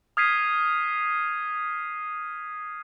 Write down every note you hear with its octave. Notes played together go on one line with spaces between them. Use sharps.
D#6 F6 G#6 B6 C7 D#7